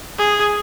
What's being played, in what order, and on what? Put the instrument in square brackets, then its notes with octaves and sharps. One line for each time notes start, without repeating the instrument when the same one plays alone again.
[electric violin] G#4